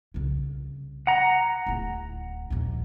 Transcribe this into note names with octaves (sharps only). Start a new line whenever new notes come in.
C2 C#3
F#5 A#5
D1 E4
A#1 D#2